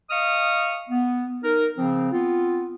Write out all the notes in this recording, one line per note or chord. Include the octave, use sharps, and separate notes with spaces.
D#5 F5 C#6 D#6 F6
B3
D#4 A#4
C#3 F3 C4
B3 C4 F4